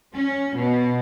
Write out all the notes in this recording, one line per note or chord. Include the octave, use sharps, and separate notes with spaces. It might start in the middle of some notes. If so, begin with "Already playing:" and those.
C#4
B2